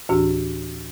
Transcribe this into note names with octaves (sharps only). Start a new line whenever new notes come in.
D2 A2 E3 D4 F#4